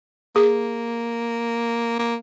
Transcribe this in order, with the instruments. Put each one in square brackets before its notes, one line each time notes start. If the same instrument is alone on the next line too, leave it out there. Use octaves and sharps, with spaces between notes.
[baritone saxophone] A#3 [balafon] G#4
[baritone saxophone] A#3